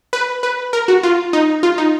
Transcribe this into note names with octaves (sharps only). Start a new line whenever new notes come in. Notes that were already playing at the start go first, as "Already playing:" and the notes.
B4
B4
A#4
F#4
F4
D#4
F4
D#4